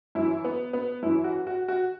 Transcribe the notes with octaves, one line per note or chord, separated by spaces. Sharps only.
F#2 E3 E4
B3
B3
F#2 E3 E4
F#4
F#4
F#4